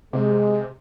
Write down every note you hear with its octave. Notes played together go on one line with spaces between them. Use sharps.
C3 G#3